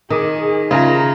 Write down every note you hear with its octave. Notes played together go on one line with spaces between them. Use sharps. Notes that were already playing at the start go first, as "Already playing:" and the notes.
D#3 G#4 D6 D#6
C#3 F4 E5 G#5 A#5